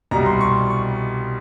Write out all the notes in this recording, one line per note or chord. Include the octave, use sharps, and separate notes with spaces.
C2 B2 G3 A#5
C6
C#6
C#6